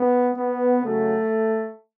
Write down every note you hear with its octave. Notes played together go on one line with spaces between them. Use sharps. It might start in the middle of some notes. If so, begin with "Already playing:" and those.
Already playing: B3
B3
C#3 F#3 A3